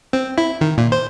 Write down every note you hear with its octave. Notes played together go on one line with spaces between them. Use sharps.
C4
E4
D#3
A#2
C5